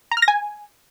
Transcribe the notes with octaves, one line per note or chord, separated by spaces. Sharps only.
A#5
F6
A#6
G#5